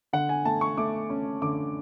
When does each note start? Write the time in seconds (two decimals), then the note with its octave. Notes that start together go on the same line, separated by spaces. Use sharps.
0.13 D3 F#5
0.29 G#5
0.45 A3 A5
0.61 C#6
0.77 A3 D6
1.10 C#4
1.42 D3 D6